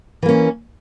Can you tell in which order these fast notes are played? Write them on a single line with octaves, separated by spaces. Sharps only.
E3 A#3 C#4